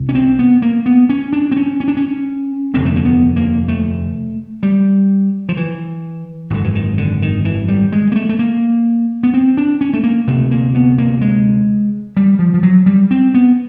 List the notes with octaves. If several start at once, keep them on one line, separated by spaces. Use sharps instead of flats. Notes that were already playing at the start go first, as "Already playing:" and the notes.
Already playing: C2 C3
C#4
C4
B3
A#3
B3
C#4
D4
C4
C#4
C#4
D4
C#4
F1 D#2 D3 C4
A3
A#3
B3
A#3
A3
G3
F3
E3
G#1 F#2 D3 D#3
E3
D#3
D3
D#3
E3
G3
G#3
A#3
A3
A3
A#3
B3
C4
D4
C#4
A3
A#3
D2 C3 A3
A#3
B3
A#3
G#3
G3
F3
F3
F#3
G3
C4
B3